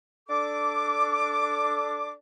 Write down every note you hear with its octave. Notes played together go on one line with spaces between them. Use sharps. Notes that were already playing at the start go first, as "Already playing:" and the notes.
D4 A4 D6